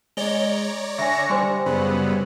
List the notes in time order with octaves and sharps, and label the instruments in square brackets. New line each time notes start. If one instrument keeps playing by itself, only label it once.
[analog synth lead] G#3 [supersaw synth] C#5 D5 A#5 [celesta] G7
[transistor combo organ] D3 C#6 [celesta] E5 G#5 [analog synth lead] A#6
[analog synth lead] G3 [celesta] C5 G#5 C6
[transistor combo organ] F#2 B3 [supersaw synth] C#3